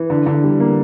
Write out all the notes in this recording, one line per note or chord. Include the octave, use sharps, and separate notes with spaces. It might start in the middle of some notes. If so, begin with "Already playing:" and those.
Already playing: E3
D3
D3
G3
A#3